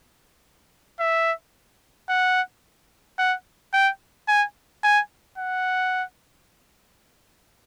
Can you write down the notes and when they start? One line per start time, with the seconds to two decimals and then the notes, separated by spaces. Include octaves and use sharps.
1.00 E5
2.09 F#5
3.19 F#5
3.74 G5
4.28 G#5
4.84 G#5
5.38 F#5